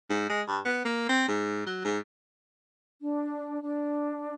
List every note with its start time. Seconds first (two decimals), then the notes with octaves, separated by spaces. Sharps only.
0.10 G#2
0.30 G#3
0.48 G2
0.65 B3
0.85 A#3
1.09 C4
1.28 G#2
1.66 F#3
1.85 G#2
3.01 D4
3.62 D4